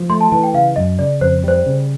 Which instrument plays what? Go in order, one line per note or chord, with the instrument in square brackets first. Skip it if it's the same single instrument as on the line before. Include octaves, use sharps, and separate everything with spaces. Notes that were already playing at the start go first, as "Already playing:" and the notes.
Already playing: [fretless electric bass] F3
[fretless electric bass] A3 [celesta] C6
[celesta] A5
[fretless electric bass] E3 [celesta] A5
[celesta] G5
[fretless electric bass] C#3 [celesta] F5
[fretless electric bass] F#2 [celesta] D#5
[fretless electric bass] C#3 [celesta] D5
[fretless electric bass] F2 [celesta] C5
[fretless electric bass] G3 [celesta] C5
[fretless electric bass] C#3